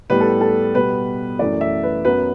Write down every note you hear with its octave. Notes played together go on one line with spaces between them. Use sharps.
A2 G3 B3 B4
A4
A4
B2 G3 B3 B4
F#2 E3 A3 D5
E5
B4
F#2 F#3 B3 B4